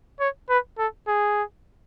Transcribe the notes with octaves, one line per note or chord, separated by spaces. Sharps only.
C#5
B4
A4
G#4